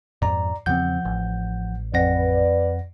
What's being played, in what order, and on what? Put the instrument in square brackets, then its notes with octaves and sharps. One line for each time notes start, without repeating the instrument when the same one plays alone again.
[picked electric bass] F2 G#2 [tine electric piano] D5 A#5
[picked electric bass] E2 C#3 C4 [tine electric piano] F3 F#5 G6
[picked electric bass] A1
[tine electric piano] F2 F#5 A#6 [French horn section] B4 D5